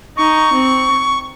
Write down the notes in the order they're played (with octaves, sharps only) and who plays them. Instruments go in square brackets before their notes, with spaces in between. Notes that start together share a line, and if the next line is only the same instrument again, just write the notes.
[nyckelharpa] D#4 [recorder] C#6
[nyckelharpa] C4